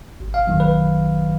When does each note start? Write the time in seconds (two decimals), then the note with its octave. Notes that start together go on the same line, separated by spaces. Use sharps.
0.20 G#1
0.34 F5
0.47 F#2 D#3 F#3
0.60 B4